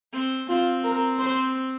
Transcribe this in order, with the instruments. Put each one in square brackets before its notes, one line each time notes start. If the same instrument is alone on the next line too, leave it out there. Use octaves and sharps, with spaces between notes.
[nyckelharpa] C4
[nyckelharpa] C4 [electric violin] F4
[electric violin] A#4
C5